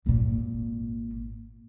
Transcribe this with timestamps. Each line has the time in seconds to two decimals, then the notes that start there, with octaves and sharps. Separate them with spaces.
0.06 G#1 A#2